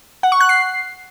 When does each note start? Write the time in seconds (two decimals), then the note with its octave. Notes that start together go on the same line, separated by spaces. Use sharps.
0.23 F#5
0.32 C#6
0.41 F#6
0.49 C7